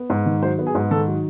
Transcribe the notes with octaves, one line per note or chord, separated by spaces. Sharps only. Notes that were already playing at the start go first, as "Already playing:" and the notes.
Already playing: B3
G#2
D#3
F#3 C5
B3
G#4
G#2
D#3 A4
F#3